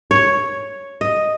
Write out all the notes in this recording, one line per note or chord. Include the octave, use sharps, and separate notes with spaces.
C#5
D#5